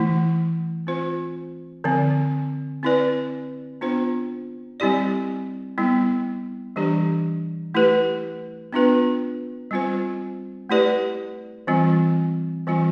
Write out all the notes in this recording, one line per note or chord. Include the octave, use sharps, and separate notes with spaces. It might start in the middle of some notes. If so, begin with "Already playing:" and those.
Already playing: E3 A3 E4
C4 F4 C5
D3 F3 C4
C4 E4 B4 D5
B3 D4 F4 C5
G3 C4 E4 G4 D5
G3 B3 E4
E3 G3 D4 G4 D5
A3 E4 G4 B4
B3 D4 F4 B4
G3 C4 F4 C5
A3 E4 G4 B4 D5
E3 G3 C4 F4
E3 G3 C4 F4